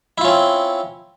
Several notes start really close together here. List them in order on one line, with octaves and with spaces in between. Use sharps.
E4 F4 C#4 C4